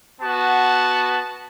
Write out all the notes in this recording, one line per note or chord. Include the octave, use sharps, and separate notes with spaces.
B3 F#4 A5